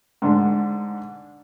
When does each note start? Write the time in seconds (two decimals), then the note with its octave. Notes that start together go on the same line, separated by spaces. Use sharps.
0.22 G#2 D3 D4